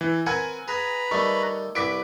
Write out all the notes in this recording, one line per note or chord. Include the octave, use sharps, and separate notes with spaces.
E3
C4 A#4 B4 F#5 G#5 G#6
G#4 B4 A#5 B5
D#3 G3 A3 C#6
C2 G4 B4 C#6 D6 B6 D7